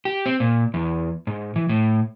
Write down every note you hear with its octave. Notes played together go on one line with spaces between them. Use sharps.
G4
C4
A#2
E2
G#2
E3
A2